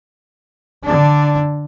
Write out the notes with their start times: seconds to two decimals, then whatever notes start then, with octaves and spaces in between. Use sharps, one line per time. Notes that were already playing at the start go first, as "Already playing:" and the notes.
0.84 D3 D4